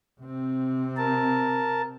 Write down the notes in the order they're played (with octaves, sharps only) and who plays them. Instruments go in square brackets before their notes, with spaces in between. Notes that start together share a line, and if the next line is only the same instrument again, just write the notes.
[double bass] C3 C4
[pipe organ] A#4 A5